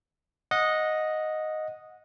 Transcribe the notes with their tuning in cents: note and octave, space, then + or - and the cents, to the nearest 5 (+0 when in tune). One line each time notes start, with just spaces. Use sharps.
D#5 +0 F#5 -20